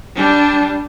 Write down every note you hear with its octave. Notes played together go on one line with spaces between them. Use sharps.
G3 D4